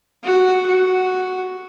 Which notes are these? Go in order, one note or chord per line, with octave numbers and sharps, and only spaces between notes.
F#4
F#4